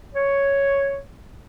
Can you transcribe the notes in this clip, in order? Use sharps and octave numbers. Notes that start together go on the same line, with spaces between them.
C#5